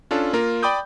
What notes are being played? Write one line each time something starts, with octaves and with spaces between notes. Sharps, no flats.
C#4 D4 F4 A4
A#3 F4 A#4
D5 G5 B5 D6 D#6 G6